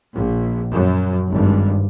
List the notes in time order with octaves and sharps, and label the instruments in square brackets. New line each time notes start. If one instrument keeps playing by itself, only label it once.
[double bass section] A#1
F#2
G#1 G2